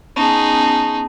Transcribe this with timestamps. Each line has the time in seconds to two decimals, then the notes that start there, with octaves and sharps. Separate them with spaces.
0.16 B3 C#4 D#4 G#4 A5